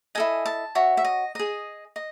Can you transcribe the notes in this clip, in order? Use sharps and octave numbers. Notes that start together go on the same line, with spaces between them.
E4 A4 D#5 G#5
A5
F#4 C#5 E5
E5
D#5
G#4 D#5
D#5